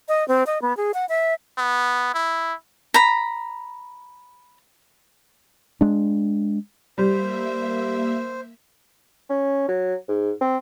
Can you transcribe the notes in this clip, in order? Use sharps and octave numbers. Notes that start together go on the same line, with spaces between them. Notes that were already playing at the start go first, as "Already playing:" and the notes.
D#5
C4
D#5
B3
G#4
F#5
E5
B3
E4
A#5 B5
G#3 D4
G3 A#3 C5 E5
C#4
F#3
G#2
C4